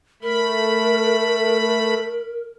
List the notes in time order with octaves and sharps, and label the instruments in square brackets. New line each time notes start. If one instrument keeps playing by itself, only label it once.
[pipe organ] A3 B5 [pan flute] A#4